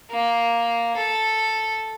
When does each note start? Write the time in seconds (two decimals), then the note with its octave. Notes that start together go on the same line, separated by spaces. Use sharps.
0.11 A#3
0.97 A4